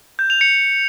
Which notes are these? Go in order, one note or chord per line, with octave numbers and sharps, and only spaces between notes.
G6
F7
C#7